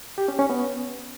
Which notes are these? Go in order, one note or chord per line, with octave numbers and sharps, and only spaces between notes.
G4
C#4
C#4
B3